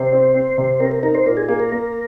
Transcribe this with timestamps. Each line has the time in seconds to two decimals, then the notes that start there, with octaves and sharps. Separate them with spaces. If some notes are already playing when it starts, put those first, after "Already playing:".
Already playing: C3 C5
0.12 C4
0.34 C4
0.58 C3
0.80 C4 A#4
0.91 A#4
1.03 D#4 A#4
1.15 C5
1.26 A#2 A#4
1.37 G#4
1.48 A#3 G#4
1.60 A#4
1.72 A#3